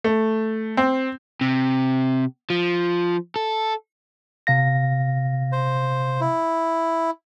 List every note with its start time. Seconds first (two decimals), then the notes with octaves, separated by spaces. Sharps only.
0.04 A3
0.77 C4
1.41 C3
2.50 F3
3.36 A4
4.47 C3 F5 A#6
5.52 C5
6.21 E4